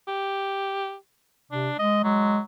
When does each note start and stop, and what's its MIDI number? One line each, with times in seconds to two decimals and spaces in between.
0.08 0.95 67
1.52 1.70 48
1.52 1.76 62
1.79 2.00 56
1.79 2.01 75
2.04 2.40 54
2.04 2.40 56